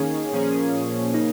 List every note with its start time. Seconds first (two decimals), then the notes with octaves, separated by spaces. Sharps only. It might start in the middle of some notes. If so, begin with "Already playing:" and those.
Already playing: D#3 A#3 C#4 G#4
0.33 A#2 F3 A#3 C#4 G#4
1.13 C#3 A#3 D#4